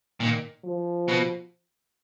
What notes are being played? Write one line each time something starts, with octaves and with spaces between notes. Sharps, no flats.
A#2 D#3
F3
B2